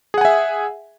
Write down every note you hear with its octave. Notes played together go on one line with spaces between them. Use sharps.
G#4 E5 F#5 G#5